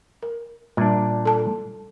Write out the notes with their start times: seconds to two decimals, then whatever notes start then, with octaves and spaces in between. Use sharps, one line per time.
0.23 A#4
0.77 A#2 G3 D4
1.25 A4 A5